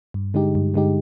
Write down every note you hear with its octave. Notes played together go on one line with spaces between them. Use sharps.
G2
D3 G#3 D#4 G4
G2
D3 G#3 D#4 G4